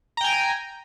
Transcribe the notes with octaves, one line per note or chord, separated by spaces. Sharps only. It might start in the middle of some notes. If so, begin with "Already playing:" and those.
G5 G#5 A#5